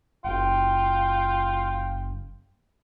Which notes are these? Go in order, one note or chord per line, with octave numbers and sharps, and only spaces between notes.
F#1 F4 G5